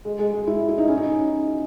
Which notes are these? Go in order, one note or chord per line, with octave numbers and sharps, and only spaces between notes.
G#3
G#3
G#3
E4
E4
D#4
C#4
D#4